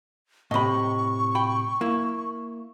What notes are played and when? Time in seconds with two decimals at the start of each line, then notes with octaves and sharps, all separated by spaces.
0.51 A2 C3 D#5 B5 C#6
1.35 G5 B5
1.81 A#3 E4